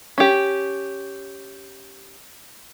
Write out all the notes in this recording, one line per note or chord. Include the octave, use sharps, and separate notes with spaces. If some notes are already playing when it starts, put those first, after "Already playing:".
C#4 G4